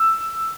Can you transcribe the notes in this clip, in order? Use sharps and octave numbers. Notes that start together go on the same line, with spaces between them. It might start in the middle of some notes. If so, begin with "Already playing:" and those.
Already playing: E6